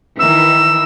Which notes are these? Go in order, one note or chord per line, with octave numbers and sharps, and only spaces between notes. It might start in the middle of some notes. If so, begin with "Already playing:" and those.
D#3 E3 A#4 E6